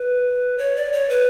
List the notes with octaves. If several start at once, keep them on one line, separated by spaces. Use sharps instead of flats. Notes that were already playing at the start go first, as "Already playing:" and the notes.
Already playing: B4
C#5
D5
C#5
B4